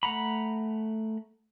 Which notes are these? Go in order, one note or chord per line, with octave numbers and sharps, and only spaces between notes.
A3 F#5 A#5 B5